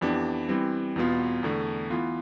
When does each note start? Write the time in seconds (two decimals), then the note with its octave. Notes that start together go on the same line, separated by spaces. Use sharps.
0.01 F2 E3 B3 D4 G4
0.49 E3 G3 C4
0.96 E2 B2 B3 F4
1.43 E2 D3 A3
1.90 E3 B3 F4